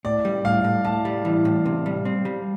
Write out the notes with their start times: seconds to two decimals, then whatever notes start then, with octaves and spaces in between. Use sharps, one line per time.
0.05 A2 D5
0.25 G3
0.45 A2 F5
0.64 A2
0.84 A2 A5
1.05 G3
1.25 E3
1.45 A2
1.66 C3
1.86 G3
2.05 C4
2.25 G3